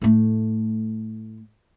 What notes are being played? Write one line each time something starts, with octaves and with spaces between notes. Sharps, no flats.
A2 A3